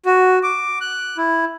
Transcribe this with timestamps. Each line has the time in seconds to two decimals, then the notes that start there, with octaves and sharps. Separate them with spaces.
0.05 F#4
0.43 D6
0.81 F#6
1.18 E4